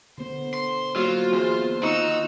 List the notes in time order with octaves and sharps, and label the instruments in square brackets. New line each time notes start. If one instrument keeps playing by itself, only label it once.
[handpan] D3 B3 [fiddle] C5
[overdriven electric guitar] C6
[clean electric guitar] F#3 [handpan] A#3 [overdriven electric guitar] F4
[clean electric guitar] E2 [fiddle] C5
[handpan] D#3 F4 [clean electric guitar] D#4 [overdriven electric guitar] F#4 [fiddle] E6